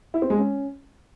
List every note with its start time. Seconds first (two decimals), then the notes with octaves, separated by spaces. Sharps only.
0.14 E4
0.22 C4
0.30 G#3
0.38 C#4